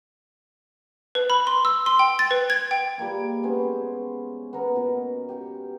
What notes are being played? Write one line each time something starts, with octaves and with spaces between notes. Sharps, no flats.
B4
B5
C6
E6
C6
G5
A6
B4
G#6
G5
G3 G#3 A#3 D6
G#3 B3 C#4 C5
B3 C#4 A#4 F#5
B2 A#4
G4 G5 C#6